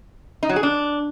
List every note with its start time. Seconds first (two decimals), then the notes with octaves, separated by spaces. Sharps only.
0.43 D#4
0.49 F#3
0.56 G#4
0.63 D4